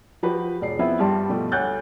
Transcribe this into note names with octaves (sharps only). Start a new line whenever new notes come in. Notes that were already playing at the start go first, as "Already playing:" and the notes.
F3 F#4 G4 B4
E1 D5 C7
F3 B3 C4 E4 B4 E5
G2 G3 G4 A5 C6 D6
B2 F3 G3 A3
D2 C#5 F#6 G6 A6